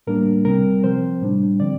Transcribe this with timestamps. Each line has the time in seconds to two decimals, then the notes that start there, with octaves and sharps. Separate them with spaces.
0.07 A2 G3 A#3 D4 A#4
0.45 C2 C3 G3 C4 A#4
0.83 C3 F3 C4 C5
1.22 A2 G3 D4
1.60 D3 F3 C4 D5